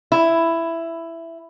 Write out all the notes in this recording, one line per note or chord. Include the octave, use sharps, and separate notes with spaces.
E4